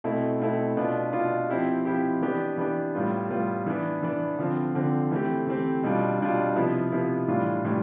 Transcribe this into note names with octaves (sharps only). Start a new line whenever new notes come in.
B2 A3 C4 E4
B2 A3 C4 E4
B2 B3 D4 F4
B2 B3 D4 F4
F3 C4 E4 G4
F3 C4 E4 G4
E3 B3 D4 G4
E3 B3 D4 G4
A2 G3 B3 F4
A2 G3 B3 F4
E3 B3 D4
E3 B3 D4
D3 F3 C4
D3 F3 C4
E3 A3 C4 G4
E3 A3 C4 G4
B2 G3 D4 F4
B2 G3 D4 F4
C3 F3 B3 E4
C3 F3 B3 E4
A2 E3 G3 D4 F4
A2 E3 G3 D4 F4